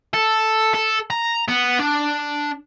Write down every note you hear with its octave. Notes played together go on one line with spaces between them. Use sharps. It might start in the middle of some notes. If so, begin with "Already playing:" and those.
A4
A4
A#5
B3
D4